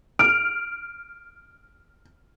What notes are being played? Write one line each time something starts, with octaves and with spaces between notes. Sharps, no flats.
F6 D7